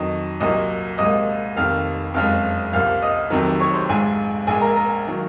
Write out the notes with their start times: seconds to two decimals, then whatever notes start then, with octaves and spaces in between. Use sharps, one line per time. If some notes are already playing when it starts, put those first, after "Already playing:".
Already playing: F2 D#3 F#3 D#5 D#6
0.40 C2 A#2 F#3 A#3 D#5 D#6
0.98 C2 A#2 F3 G#3 D#5 D#6
1.56 F1 F2 D#3 A#3 F5 F6
2.14 F#1 F2 C#3 F3 G#3 F5 F6
2.72 C2 A#2 F3 F5 F6
3.02 D#5 D#6
3.30 F1 F2 C3 D#3 F#3
3.60 C#5 C#6
3.74 C5 C6
3.89 A#1 G#2 F3 G#3 G#4 G#5
4.47 A#1 A#2 G#3 G#4 G#5
4.61 A#4 A#5
4.76 A#4 A#5
5.07 D#3 F#3 A#3